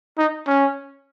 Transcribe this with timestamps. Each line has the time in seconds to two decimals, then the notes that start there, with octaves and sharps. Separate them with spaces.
0.18 D#4
0.47 C#4